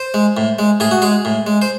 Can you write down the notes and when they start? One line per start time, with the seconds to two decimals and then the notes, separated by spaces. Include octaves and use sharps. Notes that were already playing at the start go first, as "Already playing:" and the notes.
Already playing: C5
0.14 G#3
0.37 A2
0.59 G#3
0.80 A2 G#4
0.91 F#4
1.02 G#3 G#4
1.25 A2
1.47 G#3
1.62 C5